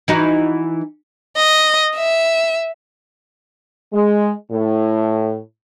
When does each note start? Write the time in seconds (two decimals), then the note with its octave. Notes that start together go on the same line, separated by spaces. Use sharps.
0.08 E3 D#4 F#4
1.37 D#5
1.96 E5
3.93 G#3
4.51 A2